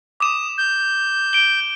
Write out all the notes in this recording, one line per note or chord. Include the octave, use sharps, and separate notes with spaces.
D6 D#6 E7
G6
D7 G7